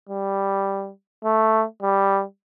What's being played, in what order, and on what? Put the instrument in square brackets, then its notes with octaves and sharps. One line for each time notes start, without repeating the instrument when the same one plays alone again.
[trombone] G3
A3
G3